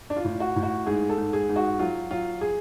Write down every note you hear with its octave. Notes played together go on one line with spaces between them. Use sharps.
D4
F4
A2
F#4
A2
F#4
G#2 G#4
A4
G#2
G#4
G#2
F#4
F#3 F4
F#3 F4
G#4